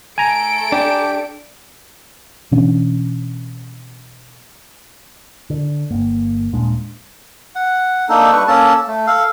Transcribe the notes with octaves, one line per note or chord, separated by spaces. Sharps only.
A3 A4 G#5 A#5 D7
D4 G4
B2 E3 C#4 D4
D3
G1 A#3
D#1 A#2 G#3 D4
F#5
A#3 D4 D#4 A4
G3 D4 B4 C#6
A#3 C#4 A4 A5
A3
A4 F5